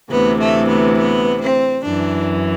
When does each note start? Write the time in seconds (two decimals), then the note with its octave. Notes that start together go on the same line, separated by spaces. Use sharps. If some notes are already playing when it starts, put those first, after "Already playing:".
0.11 D2 C3 E3 B3
0.40 A3
0.69 B3
0.98 B3
1.41 C4
1.84 F#2 E3 D4